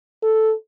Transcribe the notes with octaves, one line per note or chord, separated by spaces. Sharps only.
A4